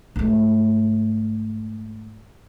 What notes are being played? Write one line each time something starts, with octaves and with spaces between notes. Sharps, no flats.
G#2 A3